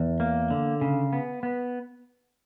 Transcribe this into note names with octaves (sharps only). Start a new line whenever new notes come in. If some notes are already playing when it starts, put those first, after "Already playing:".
Already playing: E2
A#3
D3
C#3
B3
B3